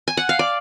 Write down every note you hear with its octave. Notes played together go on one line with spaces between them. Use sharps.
G#5
F#5
F5
D5